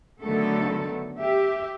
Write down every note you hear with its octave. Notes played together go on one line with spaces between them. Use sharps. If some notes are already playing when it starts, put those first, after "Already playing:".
D3 D#3 F#3 A3 B3 A4
G4 E5